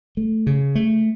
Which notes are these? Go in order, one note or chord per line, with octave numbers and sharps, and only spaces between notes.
A3
C#3
A3